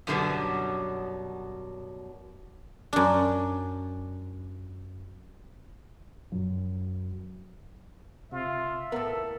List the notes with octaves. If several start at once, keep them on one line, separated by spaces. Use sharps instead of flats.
F#2 B2 D3 F#3 G3 B3
F#2 D4
F#2
C3 F4 E5
A2 B3 A4 A#4